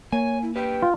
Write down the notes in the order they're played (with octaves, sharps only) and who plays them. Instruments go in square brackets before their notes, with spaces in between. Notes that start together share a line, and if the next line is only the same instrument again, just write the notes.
[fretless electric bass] A#3 [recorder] C#5 [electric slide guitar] G#5
[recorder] E4
[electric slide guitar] G4 B4 [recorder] G5
[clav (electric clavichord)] F4